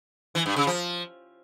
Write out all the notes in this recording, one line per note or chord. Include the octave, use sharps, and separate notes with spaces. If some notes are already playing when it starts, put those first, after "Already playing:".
E3
G2
C#3
F3